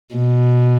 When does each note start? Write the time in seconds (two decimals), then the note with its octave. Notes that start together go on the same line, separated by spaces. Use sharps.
0.15 B2